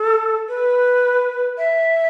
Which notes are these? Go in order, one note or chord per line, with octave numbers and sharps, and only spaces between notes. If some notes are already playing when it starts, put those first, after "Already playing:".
Already playing: A4
B4
E5